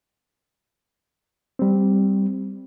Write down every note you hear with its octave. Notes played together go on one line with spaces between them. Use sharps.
G3 C4